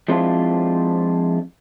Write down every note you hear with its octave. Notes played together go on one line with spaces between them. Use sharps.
F3 G#3 C4 D4 E4 F4